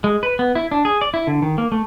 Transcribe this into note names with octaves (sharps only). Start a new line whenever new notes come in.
G#3
B4
B3
E4
D4
G#4
D5
E4
D3
D#3
A#3
A3